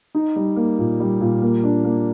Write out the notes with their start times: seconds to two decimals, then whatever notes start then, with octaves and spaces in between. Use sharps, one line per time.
0.15 D#4
0.36 G3
0.56 A#3
0.79 A#2
1.00 G3
1.21 A#2
1.42 A#3
1.64 D4
1.85 A#3